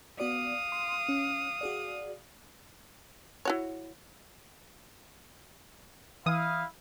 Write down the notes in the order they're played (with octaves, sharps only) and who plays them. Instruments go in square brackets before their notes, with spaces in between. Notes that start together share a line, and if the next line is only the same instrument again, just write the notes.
[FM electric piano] B3 F#4 D5 [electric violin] F5 D#6
[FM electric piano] C6
C#4
F#4 G#4 D5
[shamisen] E4 F#4 C#5
[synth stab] E3 D#6 [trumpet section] E4 F5